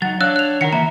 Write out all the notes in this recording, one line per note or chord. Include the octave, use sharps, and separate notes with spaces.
F#3 D#4 F#5 A6
D4 C#5 F5 E6 F#6
F#6 F7
D#3 A#4 F#5 A#6 C#7
E3 A#3 E5 A#5